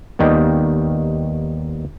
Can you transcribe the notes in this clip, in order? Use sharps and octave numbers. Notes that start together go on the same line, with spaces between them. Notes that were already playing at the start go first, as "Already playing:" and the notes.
D#2 D#3 G3 B3